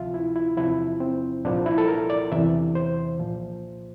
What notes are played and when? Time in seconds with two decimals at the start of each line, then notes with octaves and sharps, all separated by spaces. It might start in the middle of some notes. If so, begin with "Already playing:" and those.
Already playing: D2 C3 F3 F4 E5
0.14 E4
0.36 E4
0.57 E2 C3 F3 E4
1.00 C4
1.45 C2 A#2 F3 D4
1.66 E4
1.78 A4
1.88 A#4
2.10 D5
2.32 E2 C3 E3 E5
2.75 C5
3.19 C2 A#2 F3